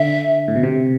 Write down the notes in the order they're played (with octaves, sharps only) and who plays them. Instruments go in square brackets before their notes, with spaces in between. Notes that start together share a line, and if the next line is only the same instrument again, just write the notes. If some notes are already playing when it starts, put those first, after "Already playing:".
Already playing: [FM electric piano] D3 [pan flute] E5
[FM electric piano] A2
B2
C3